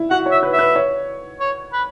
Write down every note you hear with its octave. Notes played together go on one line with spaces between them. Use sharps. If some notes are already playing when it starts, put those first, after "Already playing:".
Already playing: E4
F#4 F#5
C#5
E5
B4
E5
B4
C#5
C#5
B4